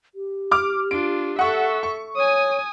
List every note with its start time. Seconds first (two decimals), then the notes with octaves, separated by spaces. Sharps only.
0.15 G4
0.51 D6 F6
0.91 D4 F4 D7
1.39 A4 E5 F#5 C#6
1.83 C#6
2.16 C#5 G#5 D#6